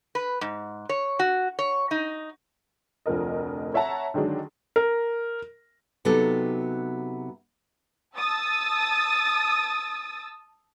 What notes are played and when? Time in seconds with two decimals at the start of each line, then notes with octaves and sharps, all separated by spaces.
0.15 B4
0.41 G#2
0.89 C#5
1.19 F#4
1.59 C#5
1.91 D#4
3.06 F1 D2 F3 A#4 D#5
3.74 C#5 E5 F#5 A5 A#5
4.14 D3 D#3 F#3 G#3 D4
4.76 A#4
6.05 C3 F#3 B3 D#4 G4 A4
8.15 A5 D#6 E6 A6